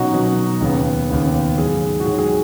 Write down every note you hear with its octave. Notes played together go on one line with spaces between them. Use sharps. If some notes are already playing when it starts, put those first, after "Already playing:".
Already playing: B2 F#3 C#4 D#4 F#4
B2 F#3 C#4
D#2 C#3 B3
D#2 C#3 B3
G#2 D#3 F#3 G#4
F#4
G#2 D#3 F#3 G#4
G#4